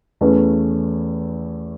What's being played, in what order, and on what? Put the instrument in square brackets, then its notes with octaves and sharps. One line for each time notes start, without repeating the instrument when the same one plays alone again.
[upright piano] E2 E3 A3 C#4